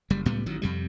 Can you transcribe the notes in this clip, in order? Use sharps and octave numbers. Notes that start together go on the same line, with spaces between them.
F#1 G3
C#2 A2 G3 B3
A1 D#3 F#3
F2 C3 G3